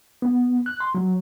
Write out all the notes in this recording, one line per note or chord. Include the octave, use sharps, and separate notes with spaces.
B3
F#6
C6
F#3